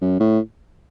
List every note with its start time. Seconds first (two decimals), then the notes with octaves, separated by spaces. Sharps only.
0.02 F#2
0.20 A2